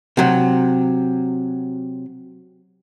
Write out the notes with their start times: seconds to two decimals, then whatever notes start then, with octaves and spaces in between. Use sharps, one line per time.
0.17 C3 F#3